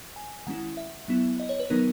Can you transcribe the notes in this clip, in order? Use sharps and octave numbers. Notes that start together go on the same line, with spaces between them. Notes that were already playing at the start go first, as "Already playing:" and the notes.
G#5
D#3 G#3 C#4 E4 F#5
E5
F#3 B3 E4
D#5
C#5
B4
D#3 F#3 B3 D#4 A#4